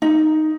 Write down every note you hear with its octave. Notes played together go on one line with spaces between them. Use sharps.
D#4